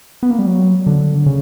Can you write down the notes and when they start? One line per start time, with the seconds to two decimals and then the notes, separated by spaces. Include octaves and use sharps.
0.23 B3
0.31 A#3
0.39 G3
0.46 F#3
0.87 D3
1.26 C#3